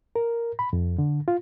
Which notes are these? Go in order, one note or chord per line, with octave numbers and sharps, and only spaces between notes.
A#4
B5
F2
D3
F4